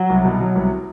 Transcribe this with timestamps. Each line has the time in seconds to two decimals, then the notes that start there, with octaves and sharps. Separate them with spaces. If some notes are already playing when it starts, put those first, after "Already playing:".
Already playing: F#3
0.10 C2
0.25 B2
0.40 F#3
0.56 C2